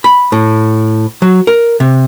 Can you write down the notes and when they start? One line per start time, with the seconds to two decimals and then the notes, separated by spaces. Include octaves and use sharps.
0.04 B5
0.32 A2
1.22 F#3
1.47 A#4
1.80 C3